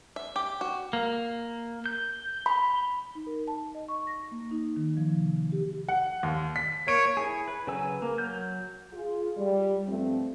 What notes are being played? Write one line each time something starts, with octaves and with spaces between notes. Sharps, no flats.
E5
G4
F#4
A#3
G6
B5
D#4
A#4
A5
D#5
C#6
A#6
A#3
D#4
D#3
F3
C3
G4
F#5
D#2
B6
A#3 C#5 D7
E4 G#4
B4
C#3 F#3 B4 G#5 E6
A#3
F#3 F6 G6
F4 G#4
G3
G2 F3 A3 C4